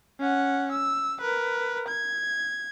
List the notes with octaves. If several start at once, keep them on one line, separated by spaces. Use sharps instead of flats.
C#4 F#5
E6
A#4 B4
G#6